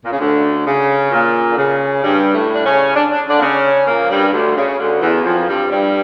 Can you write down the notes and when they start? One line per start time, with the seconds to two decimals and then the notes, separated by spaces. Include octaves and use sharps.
0.04 A#2
0.11 C#3
0.19 D2 D3
0.66 C#3
1.11 A#2
1.52 D3
1.57 C#3
2.03 G2 G3
2.33 A2 A3
2.55 D4
2.64 C#3 C#4
2.95 D4
3.12 D4
3.28 D3 D4
3.36 A#3
3.41 C#3 C#4
3.87 A#2 A#3
4.01 F3
4.10 G2 G3
4.32 D2 D3
4.56 C#3
4.78 D2 D3
5.01 E2 E3
5.24 F2 F3
5.48 G2 G3
5.70 G2 G3